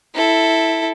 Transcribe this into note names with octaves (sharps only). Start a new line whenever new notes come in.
E4 A4